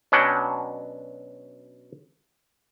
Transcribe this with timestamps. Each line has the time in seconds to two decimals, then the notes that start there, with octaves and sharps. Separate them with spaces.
0.12 B2 F#3 C#4 D4 F#5 G5